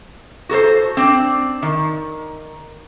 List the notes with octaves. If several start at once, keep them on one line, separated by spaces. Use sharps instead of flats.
F#4 A4 A#4 C5
C4 D4
D#3